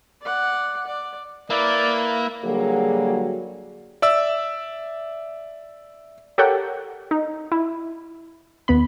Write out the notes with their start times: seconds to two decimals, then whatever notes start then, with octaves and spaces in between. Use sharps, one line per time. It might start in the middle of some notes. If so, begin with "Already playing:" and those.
0.22 D5 F#5
0.86 D5
1.50 A#3 E4 B4 D5 E5
2.45 D3 F#3 G3 A#3 F#4 G#4
4.02 D5 E5 E6
6.38 G4 A4 A#4 C#5 F#5 G5
7.11 D#4
7.52 E4
8.68 D#2 B3 B5